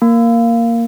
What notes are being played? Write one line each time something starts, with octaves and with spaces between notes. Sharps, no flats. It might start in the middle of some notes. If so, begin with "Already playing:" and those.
A#3